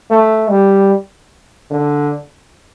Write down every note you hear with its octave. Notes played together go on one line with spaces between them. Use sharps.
A3
G3
D3